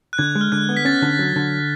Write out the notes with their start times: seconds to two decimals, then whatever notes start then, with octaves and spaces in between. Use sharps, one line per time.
0.13 F#6
0.18 D3 G#6
0.35 G#3
0.41 F6
0.52 D3 F#6
0.69 B3
0.77 B6
0.85 C#4 A6
1.02 D3
1.19 F#3
1.36 D3